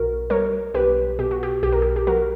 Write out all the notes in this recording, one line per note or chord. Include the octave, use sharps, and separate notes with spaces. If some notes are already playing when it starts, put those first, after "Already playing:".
Already playing: B1 F#4 A#4
G3 A#4 C#5
B1 G4 B4
B2 G4
F#4
G4
B1 G4
A#4
G4
G4
F#3 F#4 A#4